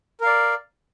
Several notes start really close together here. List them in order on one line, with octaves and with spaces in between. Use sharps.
A#4 F5 D5